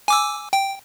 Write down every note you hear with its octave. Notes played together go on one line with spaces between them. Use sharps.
G#5 D6 E6
G5